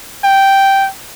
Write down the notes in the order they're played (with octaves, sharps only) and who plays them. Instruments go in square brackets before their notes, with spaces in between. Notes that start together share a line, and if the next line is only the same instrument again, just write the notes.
[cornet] G5